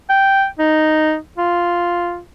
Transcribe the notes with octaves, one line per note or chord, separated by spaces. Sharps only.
G5
D#4
F4